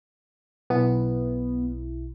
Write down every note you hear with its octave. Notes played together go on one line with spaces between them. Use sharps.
B1 B3 E4